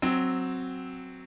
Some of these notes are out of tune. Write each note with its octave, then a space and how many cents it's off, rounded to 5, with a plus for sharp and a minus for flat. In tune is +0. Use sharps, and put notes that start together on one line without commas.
F#3 +0 C4 +0